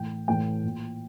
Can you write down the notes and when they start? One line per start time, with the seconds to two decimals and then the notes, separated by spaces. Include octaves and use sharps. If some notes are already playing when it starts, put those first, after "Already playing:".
Already playing: A2 E3 G5
0.28 A2 E3 G5
0.64 A#2